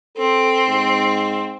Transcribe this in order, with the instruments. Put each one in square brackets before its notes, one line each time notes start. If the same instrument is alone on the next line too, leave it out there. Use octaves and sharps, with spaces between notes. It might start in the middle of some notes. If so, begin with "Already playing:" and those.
[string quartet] C4 [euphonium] A4
[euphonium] G#2